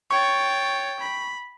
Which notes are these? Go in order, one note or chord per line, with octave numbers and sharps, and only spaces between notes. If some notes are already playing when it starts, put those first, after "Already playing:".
C#5 G5 C#6 A6
B5